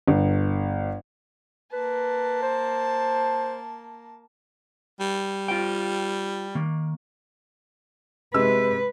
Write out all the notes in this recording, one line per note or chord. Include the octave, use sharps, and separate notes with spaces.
G1
A#3 B4 A5
C5
G3
F4 C5 G5
D#3 A#3
C3 G#3 B4 E6